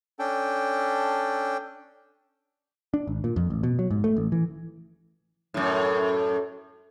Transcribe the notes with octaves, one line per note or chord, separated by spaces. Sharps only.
C#4 D4 A4 G5
D4
G#1
A#2
F2
A1
B2
F#3
G#2
A3
A1
E3
F#2 A2